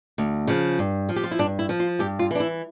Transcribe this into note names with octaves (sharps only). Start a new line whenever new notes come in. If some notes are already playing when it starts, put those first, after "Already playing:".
D2
C#3 F3
G2
F3
G4
F4
E4
G2 D4
E4
F3
F4
G2 G4
F4
E3 D4
E4